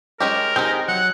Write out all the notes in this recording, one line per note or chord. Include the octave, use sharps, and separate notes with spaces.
G#3 C#4 G4 A#4
C4 D#4 G4 G#4 G5
F#3 F#5